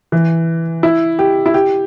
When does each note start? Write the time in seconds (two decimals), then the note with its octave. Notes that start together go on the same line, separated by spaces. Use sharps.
0.12 E3
0.83 E4
1.19 G4
1.46 E4
1.54 G4